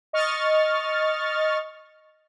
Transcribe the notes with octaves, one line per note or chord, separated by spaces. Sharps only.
D#5 C#6 F6 A6